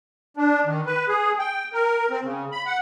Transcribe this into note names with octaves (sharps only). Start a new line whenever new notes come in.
D4
D#3
B4
G#4
G5
A#4
C4
C#3
B5
F#5